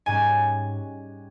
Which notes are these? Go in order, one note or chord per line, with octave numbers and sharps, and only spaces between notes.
G#2 G3 C#4 G#5